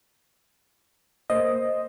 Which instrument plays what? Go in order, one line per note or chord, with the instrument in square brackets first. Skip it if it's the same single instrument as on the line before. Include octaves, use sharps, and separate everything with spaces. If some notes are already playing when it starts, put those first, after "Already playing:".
[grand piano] A#3 C5 [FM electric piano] D#5